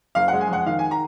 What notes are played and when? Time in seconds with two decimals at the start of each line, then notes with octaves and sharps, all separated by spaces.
0.15 F#1 F5
0.28 F#5
0.32 G#3
0.41 G#5
0.49 F2 F#5
0.66 D#3 F5
0.79 G#5
0.91 A#5